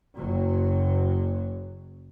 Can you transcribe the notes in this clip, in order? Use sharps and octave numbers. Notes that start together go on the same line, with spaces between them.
F#1 F#3